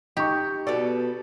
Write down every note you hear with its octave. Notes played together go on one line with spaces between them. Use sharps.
D#4 G4 C#6
B2 B3 A4 D5